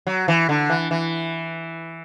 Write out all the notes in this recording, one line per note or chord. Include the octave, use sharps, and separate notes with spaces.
F#3
E3
D3
E3
E3